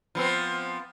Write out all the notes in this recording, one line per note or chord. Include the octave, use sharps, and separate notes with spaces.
F3 B3 C4